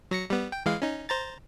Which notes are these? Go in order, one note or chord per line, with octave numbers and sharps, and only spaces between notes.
F#3 A#6 C#7
G3 B3
G5
E3 G#3 F5
C#4 D#4
C5 A#5 A6